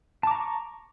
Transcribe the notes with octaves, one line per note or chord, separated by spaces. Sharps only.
A5 A#5 C#6 D6